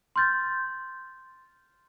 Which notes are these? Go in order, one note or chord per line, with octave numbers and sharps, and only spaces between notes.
C6 F6 G6 A6